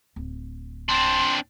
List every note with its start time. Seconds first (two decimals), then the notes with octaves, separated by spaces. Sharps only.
0.16 D1
0.89 C4 D4 C6